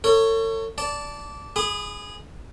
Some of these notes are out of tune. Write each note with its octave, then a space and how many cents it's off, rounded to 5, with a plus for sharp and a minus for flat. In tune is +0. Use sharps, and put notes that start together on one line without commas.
A4 +40 C#5 +0
D5 -15 A5 +0
G#4 +0 B5 +25 D#6 -35